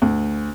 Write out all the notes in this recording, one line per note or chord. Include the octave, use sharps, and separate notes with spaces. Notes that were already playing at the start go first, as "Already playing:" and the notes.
D2